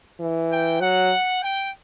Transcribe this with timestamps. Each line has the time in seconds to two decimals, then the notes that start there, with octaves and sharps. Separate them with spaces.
0.20 E3
0.51 G5
0.80 F#3 F#5
1.41 G5